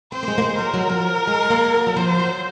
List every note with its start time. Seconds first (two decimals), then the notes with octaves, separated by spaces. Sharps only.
0.12 C4 C5
0.23 A#3
0.28 G#3
0.38 A#3
0.42 G#3
0.58 F#3 A#4
0.74 F#3
0.90 F3
1.27 G#3
1.50 A#3
1.74 F#3
1.87 F#3
1.96 F3 C5
2.20 F#3